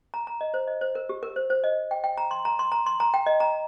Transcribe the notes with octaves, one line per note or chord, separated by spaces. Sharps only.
A#5
A#5
D#5
C5
D#5
C5
A#4
G4
A#4
C5
C5
D#5
G5
G5
A#5
C6
A#5
C6
A#5
C6
A#5
G5
D#5
A#5